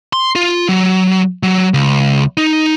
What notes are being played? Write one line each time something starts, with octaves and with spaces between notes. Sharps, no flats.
C6
F4
F#3
F#3
C#2
D#4